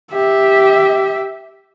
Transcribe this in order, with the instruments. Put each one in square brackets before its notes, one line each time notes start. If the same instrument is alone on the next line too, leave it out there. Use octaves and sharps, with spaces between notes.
[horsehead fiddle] G4 E5